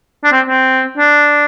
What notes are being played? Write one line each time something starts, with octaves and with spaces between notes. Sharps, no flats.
D4
C4
C4
D4